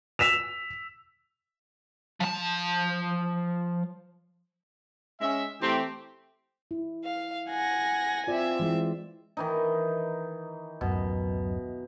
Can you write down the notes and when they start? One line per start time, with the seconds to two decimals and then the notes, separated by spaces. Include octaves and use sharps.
0.19 E6 B6 E7 F7
2.21 F3 A5
5.20 G#3 C#4 E5
5.60 E3 A3 C4 G4
6.71 E4
7.05 F5
7.50 F#5 G#5 A#6
8.27 C4 F4 D5 E5
8.59 E3 G#3 E4
9.37 D#3 E3 D#4
10.81 D1 F#2 B2